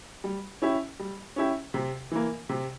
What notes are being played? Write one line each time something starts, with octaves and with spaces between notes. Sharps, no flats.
G3
C#4 E4 G4
G3
C#4 E4 G4
C3
E3 A#3
C3